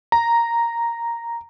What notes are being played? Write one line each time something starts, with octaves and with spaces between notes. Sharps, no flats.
A#5